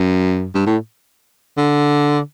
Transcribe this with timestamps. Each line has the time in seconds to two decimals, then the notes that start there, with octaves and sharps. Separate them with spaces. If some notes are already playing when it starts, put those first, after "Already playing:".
Already playing: F#2
0.55 G2
0.66 A2
1.58 D3